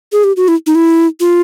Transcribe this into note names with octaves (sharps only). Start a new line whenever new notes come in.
G#4
G4
F#4
E4
D#4
E4
F4